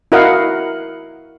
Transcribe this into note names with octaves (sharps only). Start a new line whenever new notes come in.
E4 F#4 A#4 D#5 F5 F#5